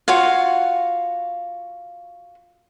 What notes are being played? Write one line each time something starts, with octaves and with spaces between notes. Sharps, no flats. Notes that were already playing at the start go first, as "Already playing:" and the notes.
F4 F#4 C#5 F5